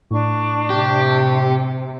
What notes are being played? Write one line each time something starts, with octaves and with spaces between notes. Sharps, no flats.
A2 D4 C#6
C3 G4